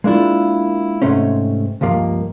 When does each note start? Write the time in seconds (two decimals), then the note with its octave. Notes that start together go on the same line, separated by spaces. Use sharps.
0.04 G#3 A#3 D4 E4 F4
1.02 G#2 C3 A3 C4 C#4
1.81 C#2 G2 F3 A#3